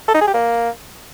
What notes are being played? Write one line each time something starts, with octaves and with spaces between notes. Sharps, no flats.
A4
D#4
G#4
G4
A#3